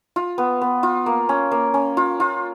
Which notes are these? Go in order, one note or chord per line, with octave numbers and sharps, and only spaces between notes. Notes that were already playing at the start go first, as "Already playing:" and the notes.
F4
B3
B3
F4
A#3
C#4
A#3
C#4
F4
F4